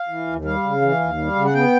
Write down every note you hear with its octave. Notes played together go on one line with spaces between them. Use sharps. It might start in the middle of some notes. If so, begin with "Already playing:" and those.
Already playing: F5
E3
D#2
G3 F5
C#3
E3
D#2
G3
C#3
F#5
B3 G5